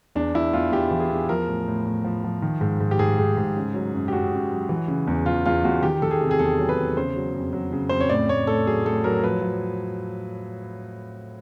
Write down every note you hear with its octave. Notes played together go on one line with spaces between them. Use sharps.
E2 D4
E2 E4
E2 F4
E2 G4
E3
G#4
E2
F3 A#4
A2
A2
A2
F3
F3
D#3
G#2
G#2
G4
G#2 G#4
G#2
G#2
C#3
F#3
F#2
G4
F#2 F#4
F#2
F#3
E3
C#3
E2
E3 F4
E2 F4
E2 F#4
D#3 G4
D#3 A4
G#4
C3
G#4
E2 A4
F#3
B4
E2
C#3 C5
F#3
F2
F#3
C#3
F2 C5
C#5
A2 D5
A2 C#5
A2 A4
F#3 G#4
A2 A4
F#3 A#4
F3 B4
F3